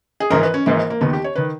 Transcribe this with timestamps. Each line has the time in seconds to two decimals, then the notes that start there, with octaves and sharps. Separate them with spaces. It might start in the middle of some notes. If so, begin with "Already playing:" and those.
0.20 G#4
0.30 G#1 G#2 E3 A#4
0.43 B4
0.54 C#4
0.66 G#1 G#2 E3 A#3
0.90 A#3
1.01 D#2 D#3 B3
1.13 G4
1.24 C#5
1.35 D#3 B4